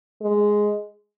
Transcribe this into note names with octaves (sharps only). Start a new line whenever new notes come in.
G#3